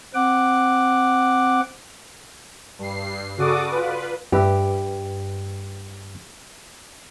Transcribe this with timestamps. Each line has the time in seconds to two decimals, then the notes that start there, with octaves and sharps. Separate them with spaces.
0.14 C4 F#5 D6
2.79 G2 C7
3.37 C#3 F#4 A4 D5 D6 D#6
3.71 F4 B4
4.32 G2 G4 B4 E5